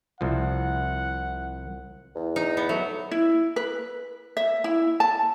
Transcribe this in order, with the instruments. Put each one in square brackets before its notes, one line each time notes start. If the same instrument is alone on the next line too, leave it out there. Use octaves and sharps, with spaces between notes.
[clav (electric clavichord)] C2 F3 [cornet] F#5
[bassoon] E2
[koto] D#4
B3
[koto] F#3 [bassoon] A3
[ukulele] E4
B4
E5
E4
A5